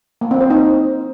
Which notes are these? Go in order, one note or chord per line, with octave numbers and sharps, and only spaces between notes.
A#3
C4
C5
D#4